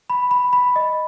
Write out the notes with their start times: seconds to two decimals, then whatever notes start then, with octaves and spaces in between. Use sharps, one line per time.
0.10 B5
0.31 B5
0.53 B5
0.76 D#5